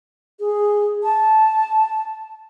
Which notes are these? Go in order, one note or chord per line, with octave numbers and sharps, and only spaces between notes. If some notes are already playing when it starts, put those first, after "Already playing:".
G#4
A5